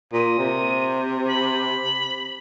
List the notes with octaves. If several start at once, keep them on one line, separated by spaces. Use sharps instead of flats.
A#2 D#6
C3
B5